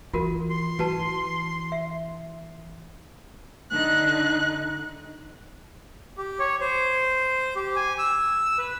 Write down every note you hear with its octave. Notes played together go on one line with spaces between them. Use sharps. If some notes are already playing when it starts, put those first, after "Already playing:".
E3 F4 F#4 A#4
C6
E3 F#4 B4 A5
E5
D3 D#4 F#6
G4
C#5
C5
G4
G#5
E6
B4